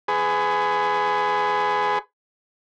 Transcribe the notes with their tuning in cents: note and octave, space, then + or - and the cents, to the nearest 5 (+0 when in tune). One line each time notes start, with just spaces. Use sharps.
G#4 +10 B4 +30 C#6 +0